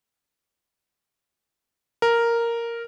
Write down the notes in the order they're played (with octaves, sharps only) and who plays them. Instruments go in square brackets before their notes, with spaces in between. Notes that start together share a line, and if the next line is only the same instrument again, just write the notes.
[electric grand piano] A#4